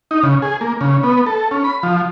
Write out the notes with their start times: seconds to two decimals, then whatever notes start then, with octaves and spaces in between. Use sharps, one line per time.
0.11 D#4
0.23 C#3
0.42 G#4
0.61 A#3
0.81 C#3
1.03 B3
1.26 A4
1.51 C#4
1.64 B5
1.83 F3